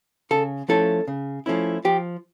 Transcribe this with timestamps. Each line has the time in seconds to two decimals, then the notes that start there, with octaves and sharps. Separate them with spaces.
0.31 C#3 A4
0.68 F3 A3 C#4 E4 A4
1.07 C#3
1.46 F3 A3 C#4 E4
1.85 F3 G4